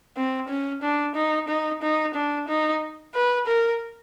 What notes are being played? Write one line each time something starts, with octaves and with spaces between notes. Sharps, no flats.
C4
C#4
D4
D#4
D#4
D#4
D4
D#4
B4
A#4